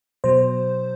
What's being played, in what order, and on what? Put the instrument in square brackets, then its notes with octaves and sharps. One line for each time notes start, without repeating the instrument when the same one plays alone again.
[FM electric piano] B2 F#3 C5